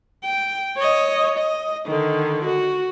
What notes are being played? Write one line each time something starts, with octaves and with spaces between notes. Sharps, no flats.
G5
C#5 D#5
D#5
D3 D#3
F#4